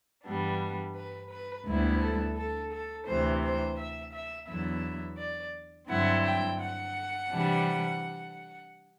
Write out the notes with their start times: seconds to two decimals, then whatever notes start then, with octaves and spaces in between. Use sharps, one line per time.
0.25 G2 E3 G3 B3 D4
0.95 B4
1.30 B4
1.66 D2 D3 G3 B3 E4
2.01 A4
2.36 A4
2.71 A4
3.07 D2 C3 E3 C5
3.42 C5
3.77 E5
4.13 E5
4.48 E2 D3 F#3 B3 E4 E5
5.18 D5
5.89 G2 D3 F#3 C4 E4 F#5
6.25 G5
6.60 F#5
7.30 C3 E3 G3 D4